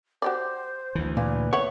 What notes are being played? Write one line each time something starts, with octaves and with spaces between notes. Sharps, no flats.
F#4 G4 C5 D5
D2 E3
A#2 B4
C#5 E5 F#5